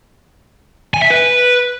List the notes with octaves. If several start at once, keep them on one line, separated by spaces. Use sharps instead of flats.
G#5
E5
B4